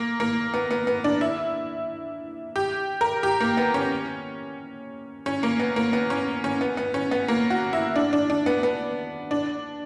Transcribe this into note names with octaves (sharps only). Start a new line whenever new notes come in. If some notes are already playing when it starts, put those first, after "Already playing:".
Already playing: A#3
A#3
B3
B3
B3
D4
E4
G4
A#4
G4
A#3
B3
C#4
C#4
A#3
B3
A#3
B3
C#4
C#4
B3
B3
C#4
B3
A#3
F#4
E4
D4
D4
D4
B3
B3
D4